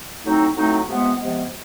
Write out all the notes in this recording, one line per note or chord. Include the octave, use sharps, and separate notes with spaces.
A2 F#3 A3 C4 D#4
A2 F#3 A3 C4 D#4
C3 F3 G#3 B3
C3 F3 G#3 B3